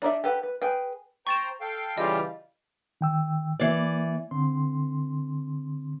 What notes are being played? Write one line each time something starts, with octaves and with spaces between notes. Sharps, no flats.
D4 D#4 D5 E5
G4 A4 B4 F#5
B4
G#4 B4 G5
C5 G5 A#5 C#6 A6 E7
A4 F5 G5
C#3 E3 G3 F4 D#5
D#3 G5 E6
E3 A#3 D5
D3 C4 C6